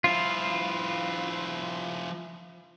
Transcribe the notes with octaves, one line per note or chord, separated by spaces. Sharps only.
F3 E4 F4